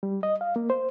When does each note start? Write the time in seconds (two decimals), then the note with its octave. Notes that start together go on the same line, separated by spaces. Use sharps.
0.03 G3
0.23 D#5
0.41 F5
0.56 A#3
0.70 C5